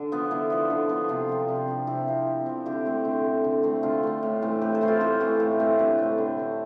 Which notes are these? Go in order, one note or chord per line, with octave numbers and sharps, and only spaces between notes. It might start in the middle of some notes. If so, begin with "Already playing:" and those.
Already playing: D3 D4
F3 B3
D3 E4
F3 B3
D3
F3 B3
C3 D4 F4
F3 C4
C3
F3 C4
C3 E4 G4
F3 C4
C3
F3 C4
D3 E4 G4
A3 C4
D3
A3 C4
D3
A3 C4
D3 F4 A4
A3 C4
A2
E3 A3 C4
A2 G4 B4
A4 C5
E3 A3 C4
F4 A4
A2 G4 B4
E3 A3 C4
A2
E3 A3 C4
D3 G4 B4
A3 C4
D3
A3 C4